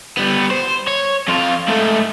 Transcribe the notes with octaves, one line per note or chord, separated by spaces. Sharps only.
G3 B3
C5
C#5
F2 F4
G#2 A3